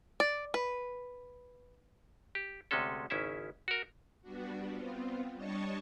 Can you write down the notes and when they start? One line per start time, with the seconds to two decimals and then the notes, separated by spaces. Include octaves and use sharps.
0.20 D5
0.54 B4
2.35 G4
2.71 D2 C3 G#3 C#4 A4
3.10 G#1 C#3 C#4 E4 E5
3.68 F#4 A#4
4.21 G3 B3 D4 F#4
4.70 B3 C4 F4
5.35 G3 D4 C#5 D#5 A5 C#6